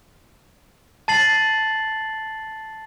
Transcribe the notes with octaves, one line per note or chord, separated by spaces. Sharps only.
A5 A6 C7 F#7